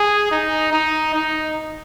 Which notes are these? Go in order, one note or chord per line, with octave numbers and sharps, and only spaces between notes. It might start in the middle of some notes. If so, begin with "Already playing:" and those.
Already playing: G#4
D#4
D#4
D#4